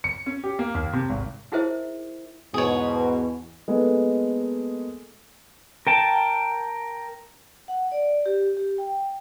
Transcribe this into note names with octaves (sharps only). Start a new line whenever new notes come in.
C#7
C#4
G4
A#3
D#2
C3
G#1
D#4 E4 G#4 A#4 C5 E5
E2 G#2 B2 G#4 C#5
G#3 A#3 B3 D#4 A4
A#4 G5 A5
F#5
D5
G4
G4
G5